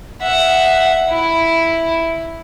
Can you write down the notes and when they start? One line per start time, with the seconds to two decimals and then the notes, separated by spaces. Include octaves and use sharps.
0.21 E5 F#5
1.09 E4